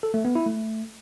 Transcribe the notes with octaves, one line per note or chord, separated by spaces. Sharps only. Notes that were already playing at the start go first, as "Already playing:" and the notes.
A4
A3
B3
E4
A3